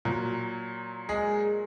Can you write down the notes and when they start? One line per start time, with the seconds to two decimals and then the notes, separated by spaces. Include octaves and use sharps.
0.05 A#2 F#3
1.09 G#3 G#4